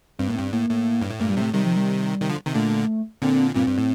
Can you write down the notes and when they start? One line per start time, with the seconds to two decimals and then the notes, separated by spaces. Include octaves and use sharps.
0.19 G2 C4
0.28 A2 A#3
0.36 G2 C4
0.52 A2 A#3
0.69 A2
1.02 G2
1.10 A2
1.20 G2 A#2 A3
1.30 G3
1.37 A2 C3 A3
1.54 C3 D#3 G3
1.65 F3
1.76 G3
2.21 C3 D#3
2.29 D3 F3
2.46 C3 D#3
2.54 A#2 D3 A3
3.22 A#2 D3 C4
3.55 G2 A#2 C4
3.67 G2
3.78 A2